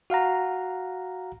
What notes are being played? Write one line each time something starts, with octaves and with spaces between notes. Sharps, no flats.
F#4 F5 F#5 A#5